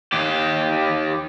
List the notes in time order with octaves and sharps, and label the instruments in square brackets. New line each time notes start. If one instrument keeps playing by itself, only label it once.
[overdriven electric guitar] D#2 G4